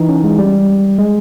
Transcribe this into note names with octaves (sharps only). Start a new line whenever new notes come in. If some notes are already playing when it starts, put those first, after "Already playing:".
Already playing: E3 D#4
C#4
G#3
G3
G#3